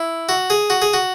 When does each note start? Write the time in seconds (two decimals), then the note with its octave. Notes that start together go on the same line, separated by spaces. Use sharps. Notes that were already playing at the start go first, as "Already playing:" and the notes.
Already playing: E4
0.29 F#4
0.50 G#4
0.70 F#4
0.82 G#4
0.94 F#4